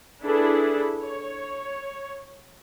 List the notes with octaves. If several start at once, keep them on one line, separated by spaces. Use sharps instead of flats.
D4 E4 G#4 A4 B4
C#5